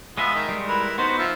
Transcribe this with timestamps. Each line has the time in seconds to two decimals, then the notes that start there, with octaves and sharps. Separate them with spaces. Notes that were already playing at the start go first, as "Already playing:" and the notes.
0.18 G#3 B3 F4 D#5 E5
0.35 D#3
0.49 G3 G#3
0.68 E4 A#4 B4
0.98 B3 D#4 F#4 C5
1.18 F3 E5